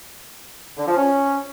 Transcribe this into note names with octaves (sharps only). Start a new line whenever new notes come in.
D3
F3
C#4